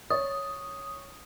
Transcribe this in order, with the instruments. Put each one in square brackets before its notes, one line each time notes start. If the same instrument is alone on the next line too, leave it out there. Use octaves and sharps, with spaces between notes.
[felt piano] C#5 [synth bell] D#6